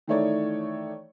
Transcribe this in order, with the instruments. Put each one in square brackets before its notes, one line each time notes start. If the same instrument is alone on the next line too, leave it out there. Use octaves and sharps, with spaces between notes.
[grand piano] D#3 E3 A3 D#4 C#5 D5